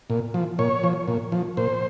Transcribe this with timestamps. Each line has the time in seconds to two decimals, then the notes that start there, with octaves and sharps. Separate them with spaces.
0.10 A#2
0.34 F3
0.59 A#2 C#5
0.84 F3
1.08 A#2
1.32 F3
1.57 A#2 C5